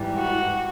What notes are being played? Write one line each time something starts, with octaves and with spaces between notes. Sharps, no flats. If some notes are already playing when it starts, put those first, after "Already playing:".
Already playing: G#2 E3 G3
F#4